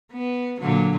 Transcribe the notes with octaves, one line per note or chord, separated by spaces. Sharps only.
B3
A#2 D3 F#3